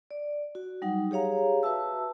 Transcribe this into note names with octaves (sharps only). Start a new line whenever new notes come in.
D5
F#4
F#3 G3 D#4 F#5
G4 G#4 C#5 F5 A#5
F#4 B4 E5 A5 E6